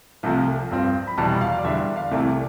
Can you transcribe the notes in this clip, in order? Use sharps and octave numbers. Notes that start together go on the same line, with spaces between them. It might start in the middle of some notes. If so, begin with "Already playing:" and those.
C2 C3 F3 A3
G2 F3 C4
B5
F1 E2 B2 G3 A5
F5
D5
E2 D3 G3 D4 E5
F5
C2 C3 E3 A3 D5